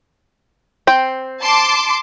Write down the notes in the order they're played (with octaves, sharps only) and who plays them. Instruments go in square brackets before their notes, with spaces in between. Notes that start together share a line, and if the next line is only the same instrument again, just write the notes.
[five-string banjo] C4 G5
[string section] A5 C6 D6